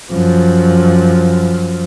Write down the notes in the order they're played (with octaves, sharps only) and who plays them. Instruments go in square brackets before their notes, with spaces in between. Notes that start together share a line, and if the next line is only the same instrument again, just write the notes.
[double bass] F#2 F3